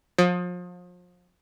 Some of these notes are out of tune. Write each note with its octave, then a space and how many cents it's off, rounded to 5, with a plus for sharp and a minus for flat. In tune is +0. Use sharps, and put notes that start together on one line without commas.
F3 +35